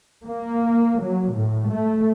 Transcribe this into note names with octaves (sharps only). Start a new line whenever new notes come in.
A#3
F#3
A2
A3